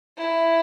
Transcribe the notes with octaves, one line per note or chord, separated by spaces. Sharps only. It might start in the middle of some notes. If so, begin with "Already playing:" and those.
E4